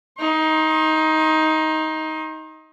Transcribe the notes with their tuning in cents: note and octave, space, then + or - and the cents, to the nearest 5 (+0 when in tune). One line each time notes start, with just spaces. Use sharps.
D#4 +15 C6 +45